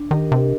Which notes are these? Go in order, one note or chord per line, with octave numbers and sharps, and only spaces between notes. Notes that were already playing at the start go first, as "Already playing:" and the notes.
Already playing: D4
D#3 G4 A#4 D#5
C3